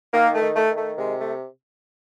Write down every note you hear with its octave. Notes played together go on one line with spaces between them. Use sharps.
D#3 A#3
A3
D#3
A3
D#3
A3
C3 G#3
A3